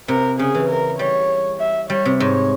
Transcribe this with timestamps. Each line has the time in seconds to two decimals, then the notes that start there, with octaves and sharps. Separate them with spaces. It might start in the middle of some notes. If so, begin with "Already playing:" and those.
0.08 C3 A#4
0.39 C#3 G#4
0.55 E3
0.69 A#4
0.99 G3 C#5
1.60 E5
1.90 G3 C#5
2.05 C3
2.20 G#2 C#5